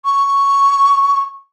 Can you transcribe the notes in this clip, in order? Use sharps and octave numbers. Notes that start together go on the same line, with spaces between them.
C#6